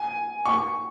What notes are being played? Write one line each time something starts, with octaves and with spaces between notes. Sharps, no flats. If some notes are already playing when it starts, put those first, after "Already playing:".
Already playing: G#5
C#6